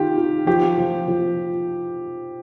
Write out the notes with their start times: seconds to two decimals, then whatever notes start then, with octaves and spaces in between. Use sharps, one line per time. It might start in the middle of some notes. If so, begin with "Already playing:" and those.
Already playing: D#3 F4 G4
0.17 F4
0.47 F3 G4
0.78 F3
1.08 F3